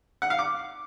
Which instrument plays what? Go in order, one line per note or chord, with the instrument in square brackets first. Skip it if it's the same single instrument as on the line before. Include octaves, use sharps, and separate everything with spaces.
[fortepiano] F#5
F5
D6